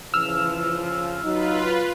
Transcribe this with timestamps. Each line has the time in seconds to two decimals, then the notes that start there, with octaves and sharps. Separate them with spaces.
0.14 C#3 E3 F3 E6 F6
1.24 F#3 D#4 F4 B4